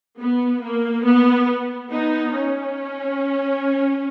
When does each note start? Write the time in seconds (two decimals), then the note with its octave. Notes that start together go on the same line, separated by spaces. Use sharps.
0.19 B3
0.62 A#3
1.05 B3
1.91 B3 D#4
2.34 C#4